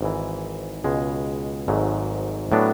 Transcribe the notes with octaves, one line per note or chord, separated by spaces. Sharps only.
G#1 G#2 E3
C#2 B2 G#3
G#1 G#2 F#3 A3
A2 F#3 B3 D4